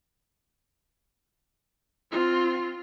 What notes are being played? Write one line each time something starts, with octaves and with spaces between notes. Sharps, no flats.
C4 F4